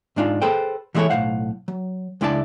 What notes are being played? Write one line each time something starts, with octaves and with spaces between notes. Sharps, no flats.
G#2 G#3 D4 D#4 F4
G#4 A4 B4 C5 G5
E3 G3 G#3 E4 A4 C#5
B1 A2 G#3 C5 F5 F#5
F#3
C#2 G#3 D4 E4 D5 A5